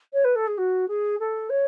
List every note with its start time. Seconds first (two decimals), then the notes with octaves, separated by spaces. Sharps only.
0.13 C#5
0.24 B4
0.35 A4
0.47 G#4
0.58 F#4
0.88 G#4
1.20 A4
1.50 C#5